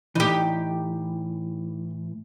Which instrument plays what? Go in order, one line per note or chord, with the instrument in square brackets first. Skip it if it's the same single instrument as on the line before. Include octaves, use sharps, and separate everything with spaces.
[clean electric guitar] A2 E3 [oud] D#4 G4